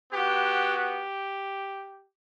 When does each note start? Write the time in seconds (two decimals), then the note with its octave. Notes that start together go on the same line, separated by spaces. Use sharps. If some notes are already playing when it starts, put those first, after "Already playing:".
0.10 B3 F#4 G4
0.76 G4